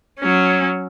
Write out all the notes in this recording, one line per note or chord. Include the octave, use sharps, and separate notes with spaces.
F#3 C#4